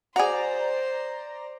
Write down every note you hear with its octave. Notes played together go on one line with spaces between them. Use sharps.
F#4 G#4 C5 D5 A#5